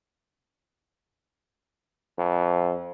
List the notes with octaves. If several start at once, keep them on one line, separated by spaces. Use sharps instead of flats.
F2